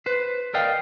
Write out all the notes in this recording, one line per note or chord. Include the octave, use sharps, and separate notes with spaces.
B4 C5
A#4 D5 D#5 F5 G5